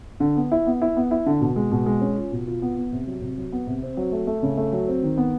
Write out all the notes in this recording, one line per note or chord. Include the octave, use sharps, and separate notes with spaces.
D3
B3
E4
B3
E4
B3
E4
D3
B2
G#3
B2
G#3
C#4
F4
B2
F4
B3
B3
C3
F#3
C3
F#3
B3
C3
C4
F#3
A3
A3
C#3
A3
F#3
C4
D#3
B3